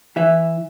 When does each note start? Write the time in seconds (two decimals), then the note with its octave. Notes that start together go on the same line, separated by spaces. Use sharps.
0.16 E3 E5